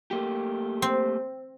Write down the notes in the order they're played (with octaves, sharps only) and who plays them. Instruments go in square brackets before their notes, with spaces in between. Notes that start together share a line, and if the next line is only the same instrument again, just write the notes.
[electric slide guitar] A3 A#3 G4
[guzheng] C4